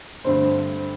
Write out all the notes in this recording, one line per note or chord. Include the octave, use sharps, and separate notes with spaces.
G2 D3 A3 C4 C5